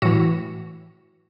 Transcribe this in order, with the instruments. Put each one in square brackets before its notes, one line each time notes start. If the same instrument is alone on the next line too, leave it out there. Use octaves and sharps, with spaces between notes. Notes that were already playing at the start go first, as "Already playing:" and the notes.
[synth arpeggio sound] A2 E3 F#4